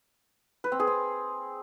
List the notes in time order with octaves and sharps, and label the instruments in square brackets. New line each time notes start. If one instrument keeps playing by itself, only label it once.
[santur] B4
C4
G#4
C4